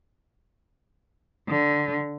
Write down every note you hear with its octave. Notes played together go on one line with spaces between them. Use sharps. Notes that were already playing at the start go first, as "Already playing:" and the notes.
D3